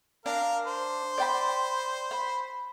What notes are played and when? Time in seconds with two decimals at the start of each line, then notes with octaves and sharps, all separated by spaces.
0.26 D4 A#4 F5
0.67 C5
1.18 D5 G5 B5
2.11 B5